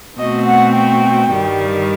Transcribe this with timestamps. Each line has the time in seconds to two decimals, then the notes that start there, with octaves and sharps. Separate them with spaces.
0.18 B2 A3 C4 F#4 D#5
0.46 F#5
0.75 G5
1.32 G2 D#3 G3